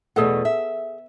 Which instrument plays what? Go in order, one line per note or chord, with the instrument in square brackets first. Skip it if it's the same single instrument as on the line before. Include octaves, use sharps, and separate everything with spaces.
[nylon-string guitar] E2 B2 A3 [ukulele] G#4 A4 F#5
[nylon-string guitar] E5